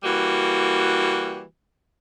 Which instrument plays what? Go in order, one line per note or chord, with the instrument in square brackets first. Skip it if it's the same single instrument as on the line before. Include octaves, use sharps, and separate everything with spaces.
[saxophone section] E3 G3 A#3 F#4